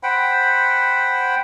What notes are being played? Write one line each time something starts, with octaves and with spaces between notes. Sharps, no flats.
C5 F#5 G5 B5